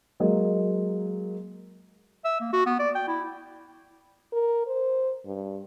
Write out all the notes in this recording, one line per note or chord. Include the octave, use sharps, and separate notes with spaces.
F#3 G#3 A#3 D#5
E5
A#3
F#4
B3
D5
G5
E4
A#4
C5
G2